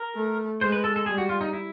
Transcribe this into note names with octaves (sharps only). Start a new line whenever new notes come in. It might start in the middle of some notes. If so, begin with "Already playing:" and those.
Already playing: A#4
A3
G#3 C5
B4
A4
A4
G3 G#4
F#4
F4
D#4
E4